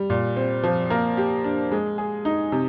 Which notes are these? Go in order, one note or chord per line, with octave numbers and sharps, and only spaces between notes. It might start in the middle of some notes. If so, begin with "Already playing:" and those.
Already playing: G3
A#2
C4
F3
A#3
G4
D4
G#3
G#4
D#4
C3